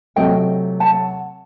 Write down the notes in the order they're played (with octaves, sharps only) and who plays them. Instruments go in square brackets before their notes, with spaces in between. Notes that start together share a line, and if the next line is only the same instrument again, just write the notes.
[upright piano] C3 F#3 A3 [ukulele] D#5 G5
[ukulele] F#5 A5